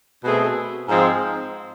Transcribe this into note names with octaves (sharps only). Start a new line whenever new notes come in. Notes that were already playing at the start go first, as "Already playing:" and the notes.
B2 A3 C4 G#4
G#2 F3 G#3 C4